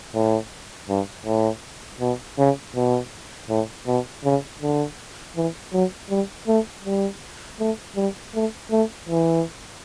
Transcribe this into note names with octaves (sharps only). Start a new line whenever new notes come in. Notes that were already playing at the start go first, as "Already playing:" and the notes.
A2
G2
A2
B2
C#3
B2
A2
B2
C#3
D3
E3
F#3
G3
A3
G3
A3
G3
A3
A3
E3